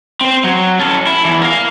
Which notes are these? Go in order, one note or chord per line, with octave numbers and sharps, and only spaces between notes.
C4 C5
F#3
C#4 A4
E4
E2 E3
A#4 F5